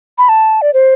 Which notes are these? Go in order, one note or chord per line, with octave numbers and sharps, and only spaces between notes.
B5
A5
D5
C5